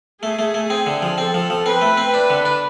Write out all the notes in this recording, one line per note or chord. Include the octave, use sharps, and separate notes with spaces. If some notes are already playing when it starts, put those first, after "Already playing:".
A3 G#4
A3
A3
C4
D3
F3
C4 A4
F3
F3
C4 B4
A3
C4
D4
D3
D4